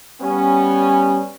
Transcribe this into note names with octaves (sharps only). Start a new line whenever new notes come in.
G3 B3 C#4